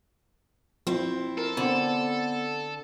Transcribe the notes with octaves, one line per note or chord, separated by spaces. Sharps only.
F3 C4 E4
A4 A#4
D3 B3 C4 F#5